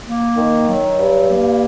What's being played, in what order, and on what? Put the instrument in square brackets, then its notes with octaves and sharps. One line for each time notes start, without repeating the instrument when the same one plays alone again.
[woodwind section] A#3
D#3
F#3
G2
A#3